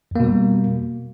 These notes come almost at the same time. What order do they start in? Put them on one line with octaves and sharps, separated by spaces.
F2 A#3 B2 G3